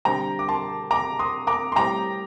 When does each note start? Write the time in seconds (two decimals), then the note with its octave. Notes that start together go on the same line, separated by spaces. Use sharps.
0.05 D3 G3 C4 G5 A#5
0.39 D6
0.48 A5 C6
0.91 A#5 D6
1.19 C6 D#6
1.47 A#5 D6
1.72 C6
1.76 A2 G3 C4 G5 A#5